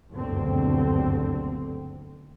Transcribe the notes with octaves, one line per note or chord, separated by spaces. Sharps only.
F#1 D2 G2 B2 D3 C4